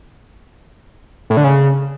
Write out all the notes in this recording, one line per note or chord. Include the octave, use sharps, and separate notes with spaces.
A2
D3
C#3